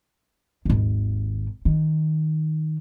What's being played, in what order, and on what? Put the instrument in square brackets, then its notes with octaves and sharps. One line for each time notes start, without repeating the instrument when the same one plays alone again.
[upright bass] G#1 D#2
D#3